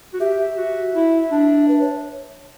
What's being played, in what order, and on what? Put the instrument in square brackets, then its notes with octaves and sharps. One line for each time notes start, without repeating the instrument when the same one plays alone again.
[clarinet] F#4
[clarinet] G4 [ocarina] E5
[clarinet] F#4
E4
D4
[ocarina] B4
C#5